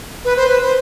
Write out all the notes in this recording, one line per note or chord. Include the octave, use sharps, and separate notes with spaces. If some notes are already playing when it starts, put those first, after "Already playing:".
B4
C5
B4
C5